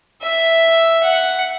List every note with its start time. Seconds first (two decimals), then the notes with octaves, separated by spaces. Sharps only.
0.22 E5
1.04 F#5